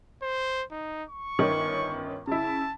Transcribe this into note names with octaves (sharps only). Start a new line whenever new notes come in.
C5
D#4
C#6
G1 D#3 C#4
C#3 E4 A5